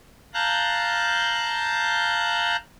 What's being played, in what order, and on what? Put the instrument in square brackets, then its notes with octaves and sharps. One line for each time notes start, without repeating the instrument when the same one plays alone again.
[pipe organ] F5 A5 A#5 F#6 G6